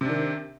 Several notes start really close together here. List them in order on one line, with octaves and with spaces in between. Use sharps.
C3 D4 D#3